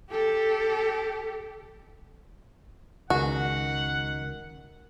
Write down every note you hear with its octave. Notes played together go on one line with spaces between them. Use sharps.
G4 A4
C#2 D#3 F#4 G#4 F#5